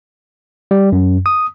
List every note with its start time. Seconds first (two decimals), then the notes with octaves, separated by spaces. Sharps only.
0.71 G3
0.92 F#2
1.26 D#6